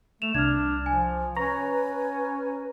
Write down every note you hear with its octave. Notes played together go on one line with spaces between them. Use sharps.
A3 E7 F7
C2 D4 F6 G#6
F3 G#5
C#4 B4 A#5 C#6